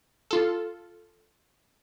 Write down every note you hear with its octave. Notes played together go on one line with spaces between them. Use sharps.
F4 A4